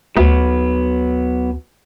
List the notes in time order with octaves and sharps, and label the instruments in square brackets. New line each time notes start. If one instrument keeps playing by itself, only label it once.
[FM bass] D2 [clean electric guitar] F#3 B3